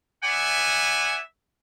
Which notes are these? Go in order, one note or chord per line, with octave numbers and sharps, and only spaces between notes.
B3 D5 E5 F#5 G#5